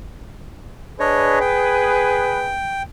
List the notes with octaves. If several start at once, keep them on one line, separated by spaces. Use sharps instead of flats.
D4 G#4 B4 C#5 D#5
G5